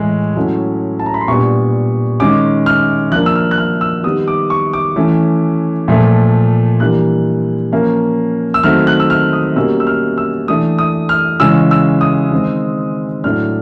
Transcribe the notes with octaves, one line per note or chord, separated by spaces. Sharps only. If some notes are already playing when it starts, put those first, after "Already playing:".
Already playing: A2 E3 G#3
A2 F#3 A3 C#4
A5
A#5
B5
C6
A#2 G3 B3 D4 C#6
D#3 G#3 C#4 D6
F6
F3 A#3 D4 F#6
E6
F6
F#6
F6
E6
D#3 G3 B3 D#6
D6
C#6
D6
E3 A3 C#4
A#2 F3 A3
E3 G3 A#3 D4 F#6
F3 A#3 C#4
E6
D#3 F#3 A3 C4 F6
F#6
E6
F6
D#6
B2 G3 A#3 C#4 E6
E6
F6
E6
E3 A3 D4 D#6
D#6
F6
C#3 E3 G#3 C#4 E6
E6
D#6
D#3 G#3 C4
A2 F#3 A3 D4 F6